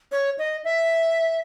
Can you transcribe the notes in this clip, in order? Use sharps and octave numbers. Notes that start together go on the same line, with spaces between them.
C#5
D#5
E5